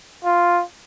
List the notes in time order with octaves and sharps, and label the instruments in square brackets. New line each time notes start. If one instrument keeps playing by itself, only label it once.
[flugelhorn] F4